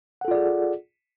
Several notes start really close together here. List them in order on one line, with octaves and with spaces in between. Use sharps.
F#5 A4 F4 D5 G#4